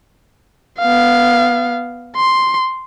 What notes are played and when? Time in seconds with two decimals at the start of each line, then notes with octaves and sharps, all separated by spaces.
0.79 B3 F5
2.16 C6